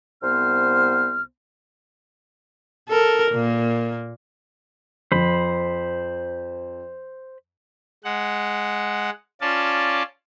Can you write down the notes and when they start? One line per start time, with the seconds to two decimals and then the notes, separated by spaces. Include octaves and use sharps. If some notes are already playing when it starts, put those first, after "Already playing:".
0.23 C2 B3 C5 F6
2.89 A4 A#4
3.31 A#2 A#3
5.12 F2 C5 B5
8.04 G#3 F#5
9.41 C#4 F4 D5 A5